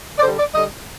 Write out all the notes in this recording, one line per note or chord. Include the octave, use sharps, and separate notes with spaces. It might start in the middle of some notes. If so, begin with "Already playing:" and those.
D5
D3 G3 C5
D5
D3 G3 D#5